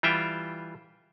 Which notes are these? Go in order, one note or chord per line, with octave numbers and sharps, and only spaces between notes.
E3 G3 F4 E5 G5